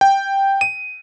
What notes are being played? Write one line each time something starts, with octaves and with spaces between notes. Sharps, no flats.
G5
D#7